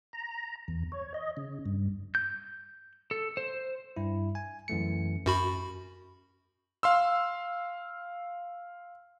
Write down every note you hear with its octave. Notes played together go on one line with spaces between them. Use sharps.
A#5
E2
C#5
D#5
C#3
G2
G6
A4
C5
G2 E4
G#5
F#2 E3 A3 C#7
F#2 F#4 B5
F5 C6 E6